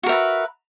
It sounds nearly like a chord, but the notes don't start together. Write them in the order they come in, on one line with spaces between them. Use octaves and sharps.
F#4 A#4 E5 B4